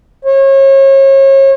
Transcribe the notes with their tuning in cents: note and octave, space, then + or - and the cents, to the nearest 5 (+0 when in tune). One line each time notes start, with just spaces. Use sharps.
C#5 -35